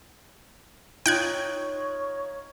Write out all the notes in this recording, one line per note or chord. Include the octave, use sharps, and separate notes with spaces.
D#4 F4 C#5 D#5 G5 F#6 G#6